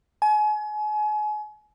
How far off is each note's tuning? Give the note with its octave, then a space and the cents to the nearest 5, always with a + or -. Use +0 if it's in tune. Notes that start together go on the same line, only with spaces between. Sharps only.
G#5 +35